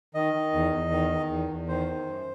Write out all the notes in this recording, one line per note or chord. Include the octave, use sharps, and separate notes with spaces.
D#3 D#5
D#3
E2
E2
D#3
D#3
E2
E2
D#3 C5
D#3
F#2